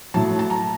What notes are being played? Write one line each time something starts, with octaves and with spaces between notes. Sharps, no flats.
A2 F#3 A5
A5
A#5